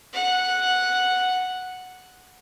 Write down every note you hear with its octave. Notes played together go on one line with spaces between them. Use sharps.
F#5